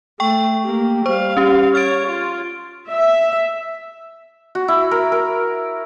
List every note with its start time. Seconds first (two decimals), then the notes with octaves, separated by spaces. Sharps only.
0.20 A3 G5 C#6
0.63 A#3 G4
1.06 G3 C5 F5 C#6
1.37 C#4 G4
1.75 C#5 F6 A6 D7
2.08 F4
2.92 E5
4.55 F#4
4.68 E4
4.91 A#4
5.12 A#4